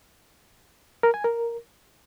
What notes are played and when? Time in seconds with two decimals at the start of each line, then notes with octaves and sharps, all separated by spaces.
1.03 A#4
1.14 G#5
1.24 A#4